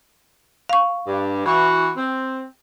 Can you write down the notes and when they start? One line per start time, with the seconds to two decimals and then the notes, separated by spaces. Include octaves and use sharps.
0.69 F5 C#6
1.07 G2
1.45 E3 F#4
1.97 C4